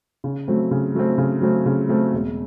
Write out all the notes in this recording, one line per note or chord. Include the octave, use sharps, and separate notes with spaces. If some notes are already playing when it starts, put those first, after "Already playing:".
C#3
F#3 A3 C4
C#3
F#3 A3 C4
C#3
F#3 A3 C4
C#3
F#3 A3 C4
E1